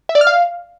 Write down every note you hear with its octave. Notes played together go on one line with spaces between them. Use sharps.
E5
D5
F6
F5